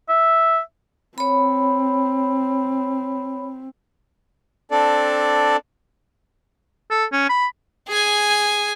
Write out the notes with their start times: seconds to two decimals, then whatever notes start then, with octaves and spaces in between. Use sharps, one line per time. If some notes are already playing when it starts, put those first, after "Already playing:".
0.09 E5
1.18 C4 C#5 B5
4.71 C4 D4 A4 D5
6.91 A4
7.12 C#4
7.29 B5
7.88 G#4 G#5